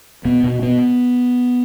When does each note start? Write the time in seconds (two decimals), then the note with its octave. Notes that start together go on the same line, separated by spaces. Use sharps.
0.25 B2 B3
0.44 B2
0.62 B2 B3